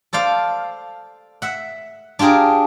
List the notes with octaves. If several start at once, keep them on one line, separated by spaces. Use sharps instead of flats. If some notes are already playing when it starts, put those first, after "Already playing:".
A4 C5 D5 F5
E5 F#5
D4 F4 G4 G#4 A#4